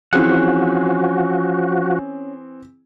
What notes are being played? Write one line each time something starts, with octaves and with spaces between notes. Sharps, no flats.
E3 F3 C4 C#4 F#4 G#4 F#5